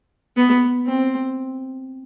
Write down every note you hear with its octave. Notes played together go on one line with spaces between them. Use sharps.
B3
C4